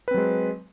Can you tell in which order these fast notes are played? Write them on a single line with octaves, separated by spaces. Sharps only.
B4 C4 F#3 G#3